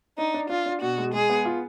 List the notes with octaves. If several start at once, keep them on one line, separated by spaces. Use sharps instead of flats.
D4 D#4
D4
D4 F4
D4
B2 F#4
G#3
G#3 G#4
B3
F4